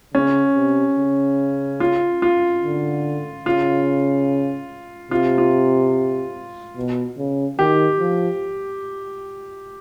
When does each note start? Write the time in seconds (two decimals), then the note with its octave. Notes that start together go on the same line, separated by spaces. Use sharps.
0.14 C#3 C#4
0.56 C3
0.98 C#3
1.80 F4
2.22 F4
2.63 D3
3.45 C#3 F4
5.11 C3 F4
5.38 F4
6.77 B2
7.18 C#3
7.59 D#3 G4
8.00 F3